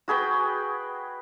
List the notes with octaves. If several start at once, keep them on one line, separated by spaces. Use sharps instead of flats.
F#4 G#4 B4 G5